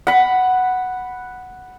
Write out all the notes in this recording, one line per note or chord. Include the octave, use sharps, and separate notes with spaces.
F#5 B5